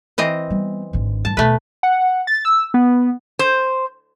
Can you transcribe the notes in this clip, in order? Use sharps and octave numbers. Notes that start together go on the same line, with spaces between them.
E3 C4 D#5
G3 B3
G#1 D3
G2 A5
D#2 B2 A3 B4
F#5
A6
E6
B3
C5